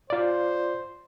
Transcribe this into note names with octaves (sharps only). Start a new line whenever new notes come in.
F4 C5 D5